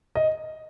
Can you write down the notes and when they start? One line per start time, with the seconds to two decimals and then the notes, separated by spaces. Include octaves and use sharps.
0.15 D#5